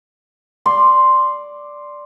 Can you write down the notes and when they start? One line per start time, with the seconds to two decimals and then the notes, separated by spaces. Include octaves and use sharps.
0.66 D5 C6